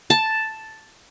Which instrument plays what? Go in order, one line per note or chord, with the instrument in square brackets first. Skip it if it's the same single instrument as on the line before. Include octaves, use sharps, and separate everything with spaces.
[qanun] A5